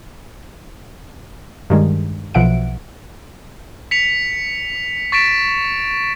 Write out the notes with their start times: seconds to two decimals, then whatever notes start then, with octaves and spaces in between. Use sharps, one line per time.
1.70 G2 D#3 G#3
2.34 B1 B2 F3 E5 F#5 D7
3.91 B6 C#7 F7
5.12 C#6 A6 B6 D7 E7